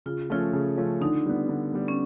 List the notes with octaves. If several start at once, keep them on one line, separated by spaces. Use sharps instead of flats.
C#3 F4
F3 A3 C#4 F4
C#3
F3 A3 C#4
D3 D#4
G3 B3
D3
G3 B3
C#4